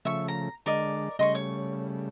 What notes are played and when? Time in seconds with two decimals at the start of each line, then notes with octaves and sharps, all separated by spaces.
0.05 C#3 F3 A3 E5 C#6
0.28 A#5
0.66 D3 G#3 A#4 D5 D#5
1.19 C#3 G3 A3 D#5 C6 C#6
1.35 C#5